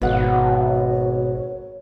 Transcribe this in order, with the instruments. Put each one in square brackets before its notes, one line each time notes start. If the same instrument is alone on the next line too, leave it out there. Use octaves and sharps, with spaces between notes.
[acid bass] G#1 [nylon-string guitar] B2 F#5 [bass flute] C#5